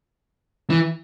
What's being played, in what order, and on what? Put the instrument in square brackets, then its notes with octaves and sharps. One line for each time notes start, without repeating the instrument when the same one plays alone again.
[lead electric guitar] E3